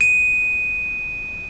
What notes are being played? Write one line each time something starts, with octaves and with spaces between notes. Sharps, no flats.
D#7